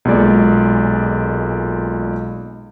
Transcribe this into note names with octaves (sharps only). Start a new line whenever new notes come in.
B1 A#2 G#3 D5